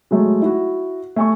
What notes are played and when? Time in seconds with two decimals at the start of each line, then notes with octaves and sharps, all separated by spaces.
0.11 F#3 G#3 A3
0.42 E4 F#4
1.16 A3 G#5 C#6